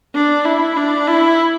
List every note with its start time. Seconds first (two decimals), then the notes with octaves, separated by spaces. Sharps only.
0.15 D4
0.45 E4
0.77 D4
1.07 E4